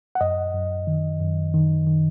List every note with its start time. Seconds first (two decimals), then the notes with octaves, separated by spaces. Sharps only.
0.15 F#5
0.21 F#2 D#5
0.54 F#2
0.87 D#3
1.20 F#2
1.54 D#3
1.87 D#3